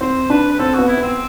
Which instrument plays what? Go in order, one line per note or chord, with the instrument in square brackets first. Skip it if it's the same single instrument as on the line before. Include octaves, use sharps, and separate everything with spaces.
[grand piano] C4 [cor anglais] C5
[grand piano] D4 [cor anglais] B4
[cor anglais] B4
[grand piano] C4 [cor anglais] A4
[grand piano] B3 [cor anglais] F#4
[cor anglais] E4
[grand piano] B3
[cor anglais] C4